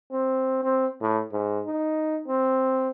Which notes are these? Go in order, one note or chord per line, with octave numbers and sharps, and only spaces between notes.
C4
C4
A2
G#2
D#4
C4